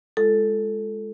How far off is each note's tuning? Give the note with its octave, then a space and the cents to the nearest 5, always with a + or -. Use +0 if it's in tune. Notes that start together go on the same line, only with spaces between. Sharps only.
G#3 +0 F4 -15 A4 +0